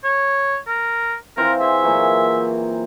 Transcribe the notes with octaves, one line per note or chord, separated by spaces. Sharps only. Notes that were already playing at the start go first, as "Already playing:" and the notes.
C#5
A#4
E3 C4 F4 A#4
G#4 E5
A#2 E3 F#3